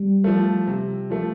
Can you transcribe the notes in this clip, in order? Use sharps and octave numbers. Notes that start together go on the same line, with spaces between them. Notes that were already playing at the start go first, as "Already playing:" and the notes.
Already playing: G3
F3 A3
C3
F3 A3